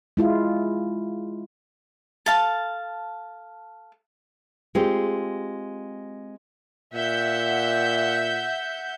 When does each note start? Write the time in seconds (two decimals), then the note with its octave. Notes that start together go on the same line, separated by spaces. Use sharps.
0.17 G#3 E4 F4
2.26 A4 F5 A5
4.75 G#3 C4 F4 G4
6.94 A#2 E5 F#5 G6